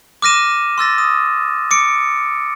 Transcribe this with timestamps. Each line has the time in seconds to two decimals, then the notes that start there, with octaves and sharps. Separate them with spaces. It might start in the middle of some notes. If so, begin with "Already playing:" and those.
0.22 D6 F6 A#6 D#7 E7
0.78 C6 E6 A6 A#6
0.98 D#6
1.71 D6 C#7 D7